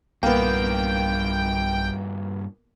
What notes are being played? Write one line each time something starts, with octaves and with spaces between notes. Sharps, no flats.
B1 G2 A#2 A#3 B3 G5